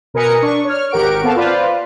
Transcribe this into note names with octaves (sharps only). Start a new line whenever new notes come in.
B2 A#4 B4 G#5 D#6 C#7
D4 C#6
C#5 F6
G#1 G4 A#4 F#5 C#6 D7
B3 C4 A4 F5 A5
F4 B4 C5 D5 F5